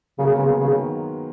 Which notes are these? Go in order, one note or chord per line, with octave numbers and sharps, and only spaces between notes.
C#3 F#3 A#3
C#3 G#3 B3
C#3
D#3 F#3